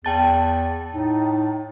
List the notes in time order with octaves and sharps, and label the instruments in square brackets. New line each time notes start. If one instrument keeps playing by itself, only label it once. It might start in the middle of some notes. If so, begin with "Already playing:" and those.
[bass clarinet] E2 [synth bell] G5 A5 A6
[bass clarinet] A2 [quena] D#4